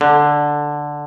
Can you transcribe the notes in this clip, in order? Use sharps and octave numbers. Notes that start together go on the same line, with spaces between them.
D3